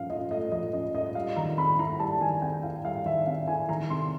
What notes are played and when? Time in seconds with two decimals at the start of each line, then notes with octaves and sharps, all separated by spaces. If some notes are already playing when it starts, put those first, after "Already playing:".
Already playing: F3 C#4 F5
0.10 F4 D#5
0.31 A3 D#5
0.52 F3 D#5
0.73 C#4 D#5
0.94 F4 D#5
1.15 G3 F5
1.36 D#3 A#5
1.58 C4 B5
1.79 E4 A#5
2.00 G3 A5
2.21 D#3 G#5
2.42 C4 G5
2.63 E4 F5
2.85 G3 F5
3.05 D#3 E5
3.27 C4 F5
3.47 E4 G#5
3.69 D#3 A#5
3.90 C3 C6